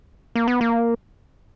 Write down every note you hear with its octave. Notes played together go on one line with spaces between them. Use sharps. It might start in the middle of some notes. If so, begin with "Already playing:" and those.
A#3
B3
A#3